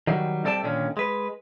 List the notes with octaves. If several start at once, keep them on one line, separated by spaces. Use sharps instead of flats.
D#3 F#3 G3
C3 G3 A4 D5 G5 A5
A#2 D3 D#3 C#4
G#3 B4